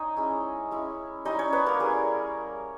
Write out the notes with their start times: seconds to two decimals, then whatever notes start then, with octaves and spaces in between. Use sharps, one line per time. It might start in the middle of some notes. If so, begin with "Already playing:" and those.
Already playing: D#4 G#4 C#5 D#5
0.16 G#3 C#4 E4
0.71 G#3 C#4 E4
1.25 G3 C#4 D#4 E4 D#5
1.39 C#4 C#5
1.53 B3 B4
1.66 A#3 A#4
1.80 G3 C#4 E4 G#4